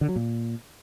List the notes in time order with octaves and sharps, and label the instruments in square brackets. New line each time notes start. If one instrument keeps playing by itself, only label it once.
[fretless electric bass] D3
F#3
A#2